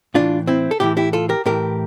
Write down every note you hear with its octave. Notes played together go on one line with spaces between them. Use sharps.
A2 E3 D4 F4
C4 E4
A4
A2 E3 E4 G4
E4 G4
F4 A4
G4 A#4
A2 E3 G4 A#4